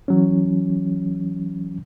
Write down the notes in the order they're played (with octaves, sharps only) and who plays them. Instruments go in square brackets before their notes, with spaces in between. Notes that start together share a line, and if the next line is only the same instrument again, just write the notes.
[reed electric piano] E3 F#3 C#4